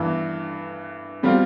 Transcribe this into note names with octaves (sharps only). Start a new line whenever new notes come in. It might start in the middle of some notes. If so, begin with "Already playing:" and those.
Already playing: G2 E3 B3
B2 G3 C4 F4